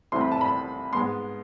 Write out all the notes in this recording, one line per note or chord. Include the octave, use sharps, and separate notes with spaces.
C2 C3 E3 A3 C4 C6
B5
A5
B5
G#2 G#3 B3 C6